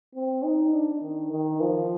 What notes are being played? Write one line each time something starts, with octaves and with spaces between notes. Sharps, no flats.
C4
D#4
D4
D#3
D#3
F3